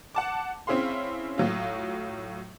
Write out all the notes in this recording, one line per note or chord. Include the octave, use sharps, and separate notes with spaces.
F#5 A5 D6
C4 C#4 E4 G#4 F5 C6
A2 F#3 F4